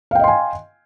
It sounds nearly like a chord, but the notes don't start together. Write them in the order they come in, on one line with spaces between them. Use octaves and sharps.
F5 G5 D#5 C6 G#5